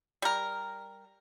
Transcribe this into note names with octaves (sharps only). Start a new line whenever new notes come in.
G3 A#4